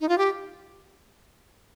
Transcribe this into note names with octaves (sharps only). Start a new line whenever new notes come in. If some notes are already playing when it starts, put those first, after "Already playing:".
D#4
F4
G4